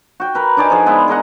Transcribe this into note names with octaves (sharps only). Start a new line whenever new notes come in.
F#4 G5
A#4 B4
D4 D#4 D5 G#5
F3 G#4 F#5
G#3 B3 E4
G#4 A#4 D#5 F#5